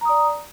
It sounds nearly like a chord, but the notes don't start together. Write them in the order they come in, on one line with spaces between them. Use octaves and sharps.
A#5 D#6 D5